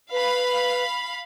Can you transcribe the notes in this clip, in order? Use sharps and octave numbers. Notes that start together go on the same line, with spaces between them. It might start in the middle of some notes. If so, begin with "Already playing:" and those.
B4 F5 B5